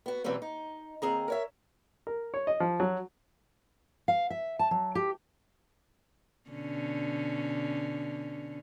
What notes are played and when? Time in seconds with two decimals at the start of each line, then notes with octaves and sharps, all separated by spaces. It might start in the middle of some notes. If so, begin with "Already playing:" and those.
0.06 B3 F#4
0.24 B2 E3 F#3 G3 C4 C#4
0.42 D#4
1.02 D#2 C4 G#4 A#5
1.28 A#4 C#5 E5
2.07 A#4
2.34 C#5
2.47 D#5
2.60 F3
2.80 F#3
4.08 F5
4.30 E5
4.59 A5
4.71 F#3
4.95 G4
6.51 B2 D3 C#4